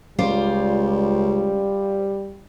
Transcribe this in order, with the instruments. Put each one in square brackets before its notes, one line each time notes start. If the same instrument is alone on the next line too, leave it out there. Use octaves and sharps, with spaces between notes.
[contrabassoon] C#2 [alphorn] G3 [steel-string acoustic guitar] F4 C5 D5